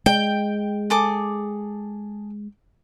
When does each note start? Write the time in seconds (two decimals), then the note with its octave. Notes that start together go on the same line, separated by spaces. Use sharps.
0.06 G#3 G5
0.90 G#4 A4 D6